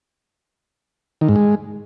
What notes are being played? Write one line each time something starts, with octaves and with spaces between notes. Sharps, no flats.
D#3
G#2
G#3